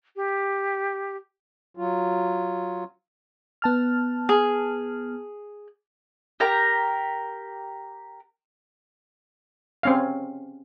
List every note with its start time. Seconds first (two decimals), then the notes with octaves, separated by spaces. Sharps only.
0.16 G4
1.77 F#3 F4
3.62 B3 A5 F6
4.29 G#4
6.40 G4 A#4 A#5
9.83 C4 C#4 F5